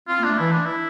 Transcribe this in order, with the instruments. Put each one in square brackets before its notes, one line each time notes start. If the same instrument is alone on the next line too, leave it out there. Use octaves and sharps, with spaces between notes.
[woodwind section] C4 [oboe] F4
[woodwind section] A#3
[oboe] D4
[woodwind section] A3
[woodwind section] E3 [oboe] E4
[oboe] D4
E4